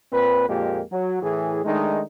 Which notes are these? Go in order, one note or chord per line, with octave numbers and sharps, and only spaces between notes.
A#2 C4 B4
F2 A#2 G#3 A#3 G4
F#3
A2 E3 G#4
D#3 G#3 A3 D4 D#4